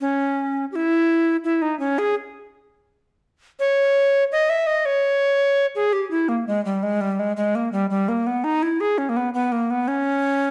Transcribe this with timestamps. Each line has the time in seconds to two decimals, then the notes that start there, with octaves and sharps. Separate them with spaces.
0.01 C#4
0.72 G4
0.76 E4
1.44 E4
1.62 D#4
1.79 C#4
1.98 G#4
3.59 C#5
4.32 D#5
4.50 E5
4.67 D#5
4.86 C#5
5.75 G#4
5.93 G4
6.11 E4
6.29 A#3
6.47 G#3
6.65 G3
6.83 G#3
7.01 G3
7.19 G#3
7.37 G#3
7.55 A#3
7.72 G3
7.90 G3
8.08 A#3
8.27 B3
8.44 D#4
8.63 E4
8.80 G#4
8.98 C#4
9.09 A#3
9.17 B3
9.34 B3
9.52 A#3
9.70 B3
9.88 C#4